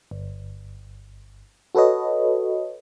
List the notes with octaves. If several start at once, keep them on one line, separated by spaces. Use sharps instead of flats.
G1
F#4 A4 B4 C#5 D#5